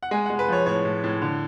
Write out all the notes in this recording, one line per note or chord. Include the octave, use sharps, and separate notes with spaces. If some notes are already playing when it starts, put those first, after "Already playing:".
F#5
G#3 G#5
F#5
G#3
B4
F3 C#5
A2 C#5
A2
A2
D3